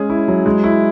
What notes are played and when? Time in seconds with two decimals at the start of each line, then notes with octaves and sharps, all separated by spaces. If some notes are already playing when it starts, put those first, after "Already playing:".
Already playing: G#3 C#4 G#4
0.10 E4
0.28 F#3
0.46 G#3
0.64 E4